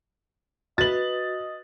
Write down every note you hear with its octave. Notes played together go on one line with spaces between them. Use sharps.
F#4 B4 D#5 A6 F#7